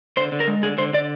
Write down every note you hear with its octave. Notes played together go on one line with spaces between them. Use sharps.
D3 C5
D3
A#4
G#3
D3 G#4
D3 C5
D3 D5